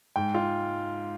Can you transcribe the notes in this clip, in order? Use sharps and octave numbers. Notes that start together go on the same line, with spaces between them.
G#2 G5
F4